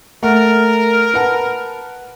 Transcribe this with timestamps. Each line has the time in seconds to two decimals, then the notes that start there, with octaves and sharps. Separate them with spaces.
0.23 A3 A#4 F#5
1.14 B4 F#5 A5